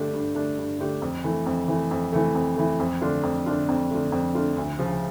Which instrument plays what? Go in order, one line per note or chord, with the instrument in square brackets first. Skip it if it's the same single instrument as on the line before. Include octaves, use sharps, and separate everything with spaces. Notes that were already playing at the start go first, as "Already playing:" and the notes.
Already playing: [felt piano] G2 D3 A3 D4 G4
G2
D3 A3 D4 G4
G2
D3 A3 D4 G4
F2
E3 A3
F2
E3 A3
F2
E3 A3
F2
E3 A3
F2
D3 A3 D4 F4
F2
D3 A3 D4 F4
F2
D3 A3 D4 F4
F2
D3 A3 D4 F4
D2
C#3 F3